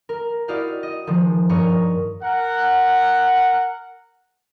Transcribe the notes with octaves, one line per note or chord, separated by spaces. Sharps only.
A#4
E4 F#4 G4 D5 D#5 F5
D#5
D#3 F3 G3 G#3
G2 A#4 C#5 D#5 C#6
A#4 F#5